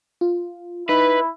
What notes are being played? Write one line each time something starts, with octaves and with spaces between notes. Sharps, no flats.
F4
D#4 E4 B4